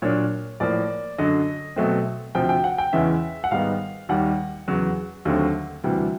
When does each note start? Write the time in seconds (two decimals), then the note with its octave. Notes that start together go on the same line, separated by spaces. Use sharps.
0.02 A#2 F#3 A#3 D4 C#5
0.60 A2 F3 A#3 D5
1.18 F#2 D3 F#3 D#5
1.76 B2 F#3 A3 C4
2.35 D2 C3 F3 G5
2.49 G5
2.64 F#5
2.78 G5
2.93 E2 C#3 E3 G#3 C#4 E5
3.44 F#5
3.51 G#2 D#3 G3 B3 D#4 F5
4.09 D#2 D#3 G3 F#5
4.68 E2 C#3 F#3
5.25 D#2 D3 F#3 A3 C4
5.84 D2 C3 E3 G3